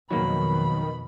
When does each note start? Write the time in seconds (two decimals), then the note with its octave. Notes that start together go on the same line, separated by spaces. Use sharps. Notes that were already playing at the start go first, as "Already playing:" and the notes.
0.10 F2 B2 D#3 F#3 A#3 B5